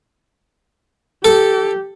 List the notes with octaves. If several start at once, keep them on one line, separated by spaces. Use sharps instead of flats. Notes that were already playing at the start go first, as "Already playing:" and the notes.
G4 A4